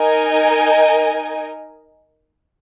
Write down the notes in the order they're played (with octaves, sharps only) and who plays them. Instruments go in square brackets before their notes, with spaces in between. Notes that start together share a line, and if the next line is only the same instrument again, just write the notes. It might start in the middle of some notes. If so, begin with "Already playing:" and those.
Already playing: [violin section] D#4 A#4 D#5 G#5